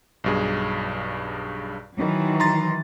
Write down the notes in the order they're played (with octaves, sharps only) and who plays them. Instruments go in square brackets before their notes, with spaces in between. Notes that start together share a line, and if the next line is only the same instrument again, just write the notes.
[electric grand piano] B1 G2 G#4
[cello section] D#3 E3 F#3
[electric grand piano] A#5 C6 A6